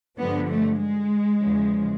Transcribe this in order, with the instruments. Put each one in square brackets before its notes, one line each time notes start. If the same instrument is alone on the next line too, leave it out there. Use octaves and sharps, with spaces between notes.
[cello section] G2 D3 F3 B3
A3
G#3
E2 C#3 F3